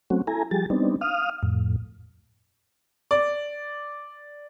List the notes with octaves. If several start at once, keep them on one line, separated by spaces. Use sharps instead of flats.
F#3 A3 C4 C#4 F#4
E4 A4 G#5 A#5
F3 G3 G4 G#4 A6
G3 B3 C4 D4 D#4
F5 D#6 F6
F2 A2
D5